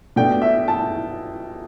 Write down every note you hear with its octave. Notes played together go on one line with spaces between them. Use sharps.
B2 A3 D4 G5
E5
A5